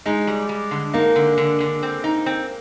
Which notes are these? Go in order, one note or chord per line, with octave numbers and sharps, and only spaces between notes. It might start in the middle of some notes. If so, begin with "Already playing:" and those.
G#3 D#4
G3
G3
D3
A#3 D#4
D3
D3
D3
C4
D#4
C4